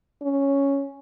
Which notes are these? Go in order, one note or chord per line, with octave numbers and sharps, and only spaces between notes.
C#4